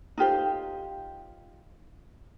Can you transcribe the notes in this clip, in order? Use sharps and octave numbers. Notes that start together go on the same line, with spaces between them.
D#4 F4 G4 C5